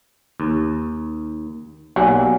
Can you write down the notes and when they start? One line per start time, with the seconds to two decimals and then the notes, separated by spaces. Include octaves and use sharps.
0.40 D#2
1.96 B1 F#3 G3 A#3 F5 F#5 G#5